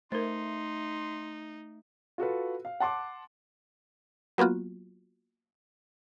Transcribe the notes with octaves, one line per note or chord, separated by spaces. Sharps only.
A3 D#4 A#4 C5 C6
F4 F#4 A4 B4
F5
F#5 A5 C6 D6
F#3 A#3 B3 F4 F#4